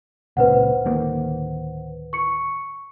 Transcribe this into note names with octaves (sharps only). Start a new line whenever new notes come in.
C#2 A#2 C#3 B4 C5 F#5
D1 D#3 A#3
C#6 C#7